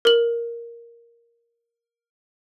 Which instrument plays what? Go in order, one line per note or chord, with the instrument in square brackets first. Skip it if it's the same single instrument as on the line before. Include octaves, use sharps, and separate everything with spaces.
[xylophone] A#4 F#7